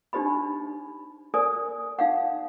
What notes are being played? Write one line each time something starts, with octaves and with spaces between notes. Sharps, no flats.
D4 D#4 G4 C5 D#5 B5
A#4 C5 D5 G#5 D#6
D#4 F5 F#5